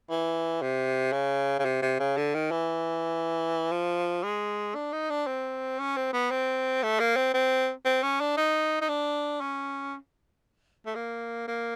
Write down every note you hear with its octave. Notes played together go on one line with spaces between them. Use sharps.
E3
C3
C#3
C#3
C3
C3
C#3
D3
D#3
E3
F3
G#3
D4
D#4
D4
C4
C#4
C4
B3
C4
A3
A#3
C4
C4
C4
C#4
D4
D#4
D#4
D4
C#4
A3
A#3
A#3